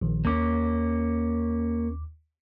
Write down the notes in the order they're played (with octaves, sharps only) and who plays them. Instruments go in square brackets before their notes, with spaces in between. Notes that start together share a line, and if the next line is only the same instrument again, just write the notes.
[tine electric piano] A#1 D#3
[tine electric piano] D#2 D6 [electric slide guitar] A#3 C#4